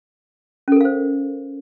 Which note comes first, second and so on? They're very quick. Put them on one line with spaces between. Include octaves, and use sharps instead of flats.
C#4 A4 A#4 F5 C5